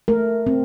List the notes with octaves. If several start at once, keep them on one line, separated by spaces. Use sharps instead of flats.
A3 A#4
C4